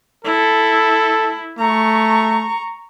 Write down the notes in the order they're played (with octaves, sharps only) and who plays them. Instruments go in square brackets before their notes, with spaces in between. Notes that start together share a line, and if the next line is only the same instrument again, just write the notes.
[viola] E4 [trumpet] A4
[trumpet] A3 [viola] A#5 C#6